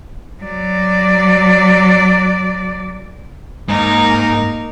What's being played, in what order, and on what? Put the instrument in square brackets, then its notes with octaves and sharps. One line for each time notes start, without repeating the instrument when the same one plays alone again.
[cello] F#3 D5
[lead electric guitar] G#2 [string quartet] A#3 D#4 A#4